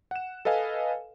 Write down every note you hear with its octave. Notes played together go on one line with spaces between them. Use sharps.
F#5 E7
A4 B4 D#5 F5 G#5